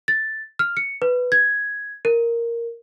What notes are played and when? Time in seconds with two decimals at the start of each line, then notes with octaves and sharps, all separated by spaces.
0.08 A6
0.59 F6
0.77 C#7
1.02 B4
1.32 G#6
2.05 A#4